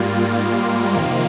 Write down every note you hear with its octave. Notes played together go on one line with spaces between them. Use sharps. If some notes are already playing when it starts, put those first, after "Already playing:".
Already playing: G#2 G3 A#3 F4
F2 C3 D#3 A#3 F4